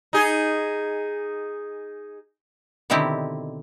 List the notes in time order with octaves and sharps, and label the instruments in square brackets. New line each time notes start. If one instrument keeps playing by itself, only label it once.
[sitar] D#4 G#4
[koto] B2 D3 D#3 C4 E4 G4